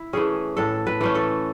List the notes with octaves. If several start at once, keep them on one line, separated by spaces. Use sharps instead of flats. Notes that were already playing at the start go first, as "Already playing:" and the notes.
Already playing: E4
E3 A3 C#4 G#4
A2 A4
B4
E3 A3 C#4
A4